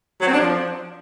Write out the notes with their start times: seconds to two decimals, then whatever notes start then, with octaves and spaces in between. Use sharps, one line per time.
0.21 F#3
0.27 C4
0.33 D4
0.38 F3